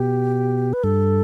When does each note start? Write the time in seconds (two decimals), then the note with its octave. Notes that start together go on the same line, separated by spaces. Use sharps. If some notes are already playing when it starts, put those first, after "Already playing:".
Already playing: B2 G4
0.73 B4
0.84 G2 A4